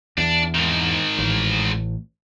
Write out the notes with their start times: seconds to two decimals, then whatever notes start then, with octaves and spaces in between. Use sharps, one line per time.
0.18 E2 D4
0.55 G#2 D#3
1.19 A1